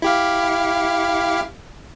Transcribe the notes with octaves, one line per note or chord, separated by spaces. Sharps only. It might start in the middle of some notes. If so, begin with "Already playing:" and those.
E4 G4 F5